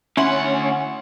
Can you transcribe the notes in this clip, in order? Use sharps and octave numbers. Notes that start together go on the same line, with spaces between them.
D2 C#4 E4 F#5 C6